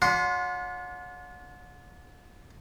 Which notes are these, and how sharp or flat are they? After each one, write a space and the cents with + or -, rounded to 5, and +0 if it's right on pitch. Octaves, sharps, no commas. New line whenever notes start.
D4 -40 F#4 -40 C6 +0